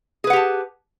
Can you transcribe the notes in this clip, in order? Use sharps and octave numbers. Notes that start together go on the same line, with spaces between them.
G4 G#4 B4 F#5 A5